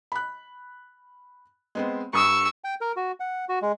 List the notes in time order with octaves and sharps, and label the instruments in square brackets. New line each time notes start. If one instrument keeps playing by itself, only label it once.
[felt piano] B5 F#6
G#3 B3 C4
[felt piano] G2 D#6 [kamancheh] C#6 E6
[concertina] G5
A#4
F#4
F#5
F#4
G#3